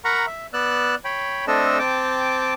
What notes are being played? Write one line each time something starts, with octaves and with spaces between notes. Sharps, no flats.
A#4 F#5 A#5 B5 C#6
E5
B3 D5 E6 F#6
C#5 G5 B5
A3 C4 D4 A4 D#5 E6
C4 G5 A5 D6